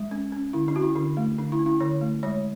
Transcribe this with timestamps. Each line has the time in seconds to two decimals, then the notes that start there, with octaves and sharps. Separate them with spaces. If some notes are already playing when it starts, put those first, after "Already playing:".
Already playing: G#3
0.11 C#4
0.32 C#4
0.53 D3 E4
0.68 D4
0.75 C#4 F#4
0.82 E4
0.96 D3 D4
1.17 A3
1.38 D3 D4
1.52 E4
1.59 C#4
1.66 E4
1.80 D3 C#5
2.01 A3
2.23 G#3 C#5